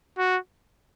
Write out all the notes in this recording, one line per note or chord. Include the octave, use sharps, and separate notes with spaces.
F#4